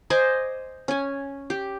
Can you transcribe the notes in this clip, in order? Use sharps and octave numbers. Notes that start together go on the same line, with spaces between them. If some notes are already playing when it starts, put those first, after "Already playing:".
C5 D#5 G#5 D6
C#4 G#5
G4